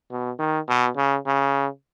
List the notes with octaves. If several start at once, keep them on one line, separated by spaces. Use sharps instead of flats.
B2
D#3
B2
C#3
C#3